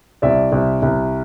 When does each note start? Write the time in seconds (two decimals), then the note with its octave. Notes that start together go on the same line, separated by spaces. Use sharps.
0.22 C2 D5 E5
0.52 C2
0.82 C2